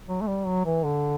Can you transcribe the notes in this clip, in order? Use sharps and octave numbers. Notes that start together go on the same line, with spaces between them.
F#3
A3
G3
F#3
E3
D3